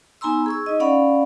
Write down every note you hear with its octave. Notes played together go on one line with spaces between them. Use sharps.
B3 D#4 G#5 A#5 C6 E6
G#4 C#6 E6
D#4 D#5
C#4 D5 F5 F#5 B5 C#6